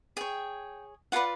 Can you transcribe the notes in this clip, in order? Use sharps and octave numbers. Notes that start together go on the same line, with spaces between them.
G#4 C#5 G5
F4 G#4 B4 D5 F#5